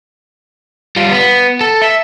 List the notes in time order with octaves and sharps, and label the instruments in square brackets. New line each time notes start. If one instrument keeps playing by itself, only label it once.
[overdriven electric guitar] G3 F4
B3
A4
E5